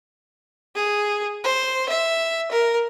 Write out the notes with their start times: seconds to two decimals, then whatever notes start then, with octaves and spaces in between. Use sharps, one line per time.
0.75 G#4
1.44 C5
1.89 E5
2.51 A#4